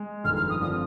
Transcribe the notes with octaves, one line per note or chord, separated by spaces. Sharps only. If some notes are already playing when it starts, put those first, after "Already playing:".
Already playing: G#3
G1 F2 D#3 F6
F6
D#6
D3 F3 C4 D#6